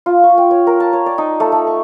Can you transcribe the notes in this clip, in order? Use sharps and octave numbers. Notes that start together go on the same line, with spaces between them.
F4
C#6
G5
C#5
A#4
A5
C#5
D5
D#4
A3
A3
C#6